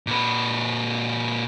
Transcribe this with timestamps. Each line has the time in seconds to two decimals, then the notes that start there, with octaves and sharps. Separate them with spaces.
0.07 A#2 B4